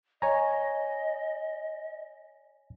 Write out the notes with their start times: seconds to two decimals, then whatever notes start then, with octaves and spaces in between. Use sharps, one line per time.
0.22 C#5 D#5 G#5 A#5